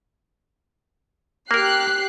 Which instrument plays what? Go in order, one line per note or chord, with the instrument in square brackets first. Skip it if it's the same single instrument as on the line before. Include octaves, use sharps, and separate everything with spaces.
[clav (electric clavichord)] A#3 A#4 [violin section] G4 F#6 C7